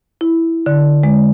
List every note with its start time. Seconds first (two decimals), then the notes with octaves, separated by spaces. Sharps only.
0.21 E4
0.66 D3
1.03 G#3